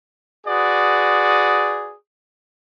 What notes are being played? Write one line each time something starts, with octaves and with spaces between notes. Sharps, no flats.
F#4 G#4 B4 D5 D#6